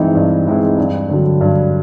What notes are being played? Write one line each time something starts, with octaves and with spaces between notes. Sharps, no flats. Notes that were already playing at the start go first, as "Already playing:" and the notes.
Already playing: G2 E3 G#3 C4 D#4
G2
E3 G#3 C4 D#4
G2
D3 F#3
G2